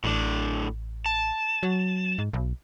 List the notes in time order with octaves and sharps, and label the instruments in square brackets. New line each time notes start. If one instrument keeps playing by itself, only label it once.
[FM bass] A1 [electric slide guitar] A2 D4
[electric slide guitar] A5
[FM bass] F#3
G#2
B1